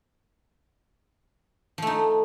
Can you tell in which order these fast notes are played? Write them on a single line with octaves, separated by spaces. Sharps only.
F3 A3 D#4